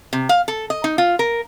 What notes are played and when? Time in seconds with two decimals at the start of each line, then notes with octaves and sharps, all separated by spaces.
0.13 C3
0.29 F5
0.48 A4
0.70 D#5
0.84 D#4
0.98 F4
1.19 A#4